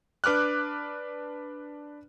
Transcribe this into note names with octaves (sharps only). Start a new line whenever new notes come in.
D4 B4 D6 F6 F#6